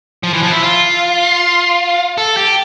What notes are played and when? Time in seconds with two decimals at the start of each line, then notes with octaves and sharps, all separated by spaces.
0.23 F3
0.33 E3
0.43 F3
0.52 E4
0.63 F4
2.18 A4
2.37 G4